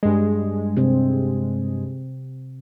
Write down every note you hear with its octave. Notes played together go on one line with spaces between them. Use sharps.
G2 G#3
C3 C4